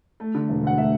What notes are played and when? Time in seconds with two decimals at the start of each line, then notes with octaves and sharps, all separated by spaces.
0.20 A3
0.35 D3
0.49 E1
0.63 D2 F#5
0.77 A3 E5